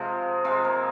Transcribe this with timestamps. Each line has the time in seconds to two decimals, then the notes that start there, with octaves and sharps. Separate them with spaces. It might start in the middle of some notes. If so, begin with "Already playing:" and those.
Already playing: C3 F3 G#3 F4
0.44 C3 F3 G#3 C4
0.65 A#3